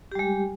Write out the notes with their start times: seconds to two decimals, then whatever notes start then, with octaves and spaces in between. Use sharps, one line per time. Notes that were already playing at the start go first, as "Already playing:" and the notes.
0.12 G4
0.15 G3
0.19 G#3